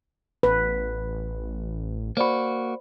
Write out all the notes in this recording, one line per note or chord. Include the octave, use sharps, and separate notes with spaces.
A1 B4
A#3 F#4 C5 D5 B5